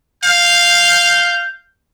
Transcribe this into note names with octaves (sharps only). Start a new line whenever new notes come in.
F5 G6